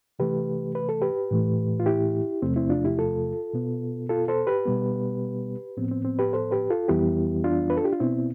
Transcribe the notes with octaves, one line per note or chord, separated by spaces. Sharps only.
C3 E3 A3 G4 B4
B4
A4
G4 B4
A2 E3 A3
F4
E4 G4
E2 C3 F3 A3 C4
C4 E4
D4 F4
E4 G4
F4 A4
B2 B3
F4 A4
A4 C5
G4 B4
B2 G3 B3
A2 F3 B3 C4
C4
C4
G4 B4
A4 C5
G4 B4
F4 A4
F2 E3 G3 B3 E4 G4
D4 F4
B4
A4
G4
F4
B2 B3 C4 E4